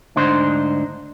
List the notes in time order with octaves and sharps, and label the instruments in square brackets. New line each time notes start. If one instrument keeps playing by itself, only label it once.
[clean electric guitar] D2 G#2 D4 D#4 C5